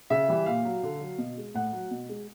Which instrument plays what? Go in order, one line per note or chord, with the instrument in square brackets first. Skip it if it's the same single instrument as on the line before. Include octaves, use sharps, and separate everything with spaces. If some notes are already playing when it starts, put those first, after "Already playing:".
[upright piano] C#3 E5
E3 G3
A#2 F5
F#3
D3
F#3
B2
G#3
A2 F#5
F#3
B2
G#3